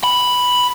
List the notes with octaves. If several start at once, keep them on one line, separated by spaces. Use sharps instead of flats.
B5